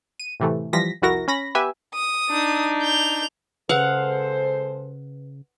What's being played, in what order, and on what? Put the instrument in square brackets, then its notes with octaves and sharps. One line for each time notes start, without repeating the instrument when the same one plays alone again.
[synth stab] D#7
A2 C3 E3 A3
E3 F3 G3 A#6 B6
C2 F2 E4 F#4 A#4 A#6
C#4 B5 A#6
B3 G4 B4 E5 G#5
[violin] D#6
[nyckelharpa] D4 D#4
[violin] G6 F7
[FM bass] C#3 [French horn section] G#3 A4 C5 [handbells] B4 [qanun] F5 F#5